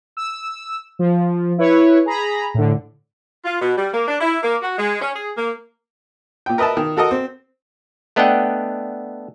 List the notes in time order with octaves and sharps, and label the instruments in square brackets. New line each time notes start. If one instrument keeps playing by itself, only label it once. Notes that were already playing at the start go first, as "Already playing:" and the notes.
[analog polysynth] E6
F3
E4 B4 C#5
G#4 A#5 B5
A2 D3
[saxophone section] F4
B2
G3
A#3
D4
E4
A#3
F#4
G#3
C#4
G#4
A#3
[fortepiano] A#2 G5
A#4 B4 D#5 E5 A5
D#3
F#4 A4 A#4 D#5
C4
[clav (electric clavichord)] A3 B3 D4 D#5 F#5 G5